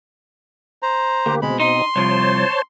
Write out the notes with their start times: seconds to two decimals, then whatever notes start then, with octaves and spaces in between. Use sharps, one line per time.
0.82 C5 A#5
1.26 D2 A#3 G4
1.42 B2 G#3 C4 B5
1.60 D#4 C6
1.96 C2 F3 C5 C#5 A5